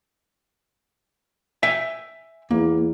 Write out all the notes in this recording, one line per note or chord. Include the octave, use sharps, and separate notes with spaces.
E5 G5 G#5
E2 A#3